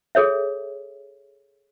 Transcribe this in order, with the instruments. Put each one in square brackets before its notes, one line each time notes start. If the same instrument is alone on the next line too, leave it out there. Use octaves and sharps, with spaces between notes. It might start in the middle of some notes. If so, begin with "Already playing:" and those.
[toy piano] G#4 A4 C#5 E5